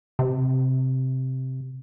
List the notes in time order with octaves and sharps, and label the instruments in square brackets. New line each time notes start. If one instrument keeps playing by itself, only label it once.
[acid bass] C3